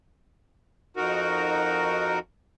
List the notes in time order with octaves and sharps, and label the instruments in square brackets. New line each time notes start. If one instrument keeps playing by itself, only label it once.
[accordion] F2 D#4 F#4 A#4